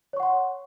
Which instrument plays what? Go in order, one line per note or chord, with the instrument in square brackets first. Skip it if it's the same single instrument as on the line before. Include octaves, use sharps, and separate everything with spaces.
[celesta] C#5
C#6
F#5
C6